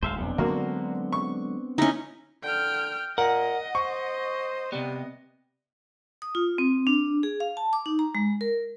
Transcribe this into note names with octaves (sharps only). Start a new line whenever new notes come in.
D1 D2 G#3 C5 E5 F5
F1 B1 C3 B3 C4 D4
D3 F#3 G#3 A#3 F#4
C#6
C#4 D#4 E4
D3 G5 F6
A#2 A#4 D#5 F#5
C5 C#6
C3 G3 B3
D#6
F4
C4
D4
G#4
F5
A5
D6
D#4
A#5
G#3
A#4